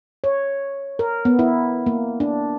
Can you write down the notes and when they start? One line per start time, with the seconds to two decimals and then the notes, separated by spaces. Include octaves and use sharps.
0.24 C#5
0.99 A#4
1.25 B3
1.39 E4
1.86 A#3
2.20 D4